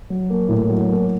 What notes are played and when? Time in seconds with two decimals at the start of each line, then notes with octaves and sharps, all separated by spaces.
0.10 F#3
0.30 A#3
0.49 A2
0.69 F#3
0.89 A#3